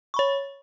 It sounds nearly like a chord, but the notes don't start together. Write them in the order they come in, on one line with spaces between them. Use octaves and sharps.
C#6 B5 C#5